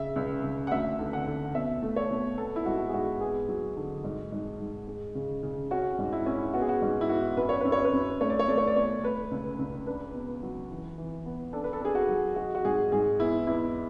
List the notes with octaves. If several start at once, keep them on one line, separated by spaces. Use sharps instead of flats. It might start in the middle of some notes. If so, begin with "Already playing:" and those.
Already playing: C#3 E5
C#2
C#2
F#5
D2 E5
D3
F#5
D3
B2 E5
A3
C#5
B2
B3 A4
E4
G#2 F#4
G#4
G#2 F#4
B3 G#4
F#3
D3
G#2
G#2
G#2
G#3
C#3
C#3
C#4 F#4
G#2
E4
C#4 E4
B3 F#4
G#4
F#4
G#2
E4
B3 F#4
F#2 B4
C#5
F#2 B4
C#5
B4
F#2
A3 C#5
D5
C#5
A3 D5
C#5
D5
B2 C#5
A3 B4
C#2
C#2
D4 B4
B2
F#3
E3
E3
B3
D4 A4
B4
A4
D4 G#4
F#4
F#3
G#3 F#4
F#4
G#2 G#4
G#2 G#4
E2 E4
E2 E4